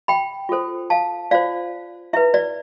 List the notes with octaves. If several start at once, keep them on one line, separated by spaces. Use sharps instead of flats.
G5 B5
F4 A4 C5
F5 A5
F4 C5 D5 F5
E4 B4 E5
D5